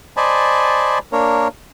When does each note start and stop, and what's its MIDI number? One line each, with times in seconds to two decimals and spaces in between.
0.17 0.99 72
0.17 0.99 74
0.17 0.99 75
0.17 0.99 80
0.17 0.99 81
0.17 0.99 83
1.12 1.48 58
1.12 1.48 62
1.12 1.48 70
1.12 1.48 73